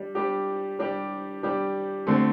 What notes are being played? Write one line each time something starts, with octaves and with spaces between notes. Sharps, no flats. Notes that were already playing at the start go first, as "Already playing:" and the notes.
Already playing: G3 D4
G3 D4 G4
G3 D4 G4
G3 D4 G4
D3 A3 C4